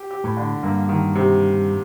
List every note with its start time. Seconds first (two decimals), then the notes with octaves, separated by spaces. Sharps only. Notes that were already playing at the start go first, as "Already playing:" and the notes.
Already playing: G4
0.11 G4
0.24 A2
0.37 D3
0.63 G2 A#3
0.89 D#3
1.15 C3